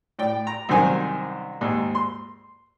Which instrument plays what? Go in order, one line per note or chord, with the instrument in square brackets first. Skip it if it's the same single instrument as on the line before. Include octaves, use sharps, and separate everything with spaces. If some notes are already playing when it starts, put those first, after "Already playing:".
[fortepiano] A2 D5 G5
A#5
C2 F#2 D#3 C5 G#5
D#2 G#2
C6